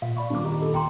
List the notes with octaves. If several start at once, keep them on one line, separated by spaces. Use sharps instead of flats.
A#2 F5
D5 B5 C#6
D#1 D4 D6
G4 D#5 A#5
A4
D#2 G5 A#5 C6